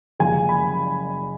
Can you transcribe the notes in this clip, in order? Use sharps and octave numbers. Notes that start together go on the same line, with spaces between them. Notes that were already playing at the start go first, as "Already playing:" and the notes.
F#1 F#2 F3 G#3 G#5
B5